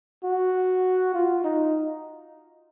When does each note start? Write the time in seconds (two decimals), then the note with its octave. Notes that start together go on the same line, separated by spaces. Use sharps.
0.24 F#4
1.14 F4
1.44 D#4